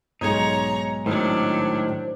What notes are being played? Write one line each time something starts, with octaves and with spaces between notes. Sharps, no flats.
B1 G#2 G#3 D#4 C#5 A#5
A2 D#3 F#3 D4 C5